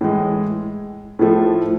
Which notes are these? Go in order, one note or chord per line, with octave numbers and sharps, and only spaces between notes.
A2 E3 G#3
A2 F3 A3